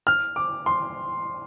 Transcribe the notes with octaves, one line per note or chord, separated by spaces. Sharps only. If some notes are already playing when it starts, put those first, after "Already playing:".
F6
D6
C6